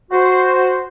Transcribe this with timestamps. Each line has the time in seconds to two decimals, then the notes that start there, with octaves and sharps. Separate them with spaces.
0.11 F#4 C5